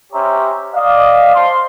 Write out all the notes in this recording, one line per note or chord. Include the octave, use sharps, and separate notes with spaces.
C#4 G4 C5 C#5 E5 A#5
D5 D#5 F5
C5 F5 A5 C6